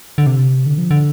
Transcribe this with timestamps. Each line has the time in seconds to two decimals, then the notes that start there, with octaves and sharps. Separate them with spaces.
0.18 D3
0.26 C3
0.66 D3
0.78 F3
0.91 D3